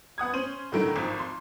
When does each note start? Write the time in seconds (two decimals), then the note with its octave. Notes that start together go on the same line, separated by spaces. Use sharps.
0.18 B3 F#5 D#6 G#6
0.33 C#4 C5 D#7 F#7
0.72 A2 D3 D#3 F#3 A3 D7
0.96 G#1 F3
1.19 C6